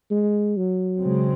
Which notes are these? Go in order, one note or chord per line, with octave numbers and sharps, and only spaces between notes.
G#3
F#3
C#3 G#3 C4